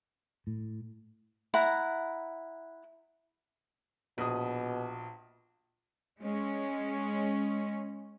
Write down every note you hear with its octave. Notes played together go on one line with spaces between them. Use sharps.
A2
E4 F#5 A#5
A#1 B2 D#6
G#3 C#4